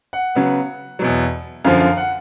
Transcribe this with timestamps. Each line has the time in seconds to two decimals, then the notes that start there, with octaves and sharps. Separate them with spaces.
0.13 F#5
0.35 C#3 F#3 B3
0.99 E2 B2 F#3
1.64 F#2 D3 F3 F5
1.80 F5
1.97 F#5